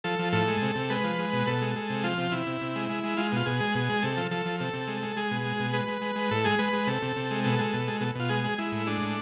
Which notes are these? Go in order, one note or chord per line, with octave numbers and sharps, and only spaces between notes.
F3 A4
F3
A2 A4
G#3
C3
C3
G#3 B4
F3
G#3
B2
B2 A4
G#3
G#3
C3
F3 F4
C3
C3 E4
C3
C3
G#3
G#3
G#3
G#3 F4
B2 F4
B2 G#4
G#3
B2
G#3
C3 A4
F3
F3 A4
F3
C3 A4
C3
G#3
G#3
G#3 G#4
B2
G#3
B2
G#3 B4
G#3
G#3
G#3
A2 A4
G#3 G#4
G#3 B4
G#3
C3 A4
C3
C3
G#3
B2 A4
G#3
B2
G#3
B2 A4
B2 F4
G#3 G#4
G#3
G#3 E4
A2
G#3 D4
A2